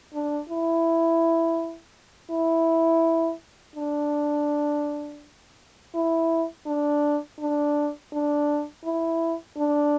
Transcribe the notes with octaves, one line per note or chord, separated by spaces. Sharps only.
D4
E4
E4
D4
E4
D4
D4
D4
E4
D4